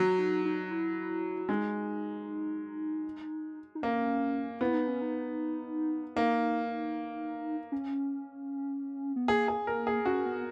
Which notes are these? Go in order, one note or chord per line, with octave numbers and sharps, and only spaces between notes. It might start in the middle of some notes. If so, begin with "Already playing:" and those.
Already playing: F#3
D#4
D#4
E4
G#3 D#4
D#4
A#3 C#4
B3 E4
D#4
C#4
D#4
A#3 D#4
C#4
B3
A#3 G#4
G#4
A#4
G#4
C#4 F#4
B3